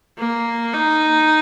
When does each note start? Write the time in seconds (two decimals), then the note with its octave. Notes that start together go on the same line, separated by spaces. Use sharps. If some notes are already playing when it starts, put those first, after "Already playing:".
0.19 A#3
0.74 D#4